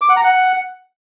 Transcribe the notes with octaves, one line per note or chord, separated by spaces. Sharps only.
D6
F#5
A#5
F#5